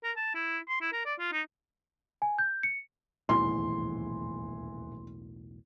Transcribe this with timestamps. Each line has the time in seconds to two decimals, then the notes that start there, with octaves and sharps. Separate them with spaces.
0.04 A#4
0.17 A5
0.35 E4
0.69 C6
0.81 E4
0.93 A#4
1.05 D5
1.19 F4
1.32 D#4
2.22 G#5
2.39 G6
2.63 C#7
3.29 D#1 B1 E2 A2 E3 C6